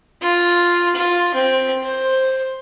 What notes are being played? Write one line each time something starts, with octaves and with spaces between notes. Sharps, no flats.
F4
F4
C4
C5